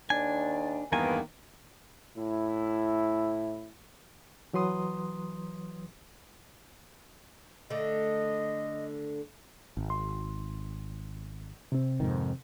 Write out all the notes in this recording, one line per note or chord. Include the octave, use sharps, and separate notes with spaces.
D#2 D4 G#5
E2 G2 D#3 A#3 B3 G#5
A2 E4
E3 F#3 B4 C6 D#6
D3 A3 D#5
G#1
C6
C3 C4
F2 G#2 D#3